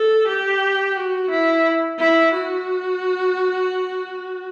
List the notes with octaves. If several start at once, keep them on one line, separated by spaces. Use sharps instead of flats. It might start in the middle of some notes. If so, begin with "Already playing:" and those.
Already playing: A4
G4
F#4
E4
E4
F#4